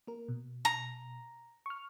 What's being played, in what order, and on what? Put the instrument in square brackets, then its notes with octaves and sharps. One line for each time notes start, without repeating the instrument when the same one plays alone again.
[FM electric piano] A#3 A#4
B2
[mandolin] A#5
[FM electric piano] C#6 F6